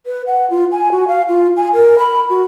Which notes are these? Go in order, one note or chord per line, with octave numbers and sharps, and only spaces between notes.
B4
F#5
F4
G#5
F#4
F5
F4
G#5
A#4
B5
F#4